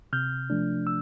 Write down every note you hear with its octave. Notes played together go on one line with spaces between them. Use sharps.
C3 F6 G6
F3 A3 D4
E6